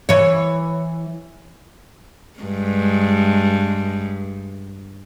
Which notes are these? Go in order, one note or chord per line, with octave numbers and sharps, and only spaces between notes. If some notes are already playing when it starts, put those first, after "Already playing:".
E3 C#5
G2 G#3